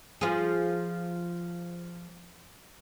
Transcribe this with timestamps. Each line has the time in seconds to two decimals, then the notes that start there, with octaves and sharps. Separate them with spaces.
0.21 F3 G#4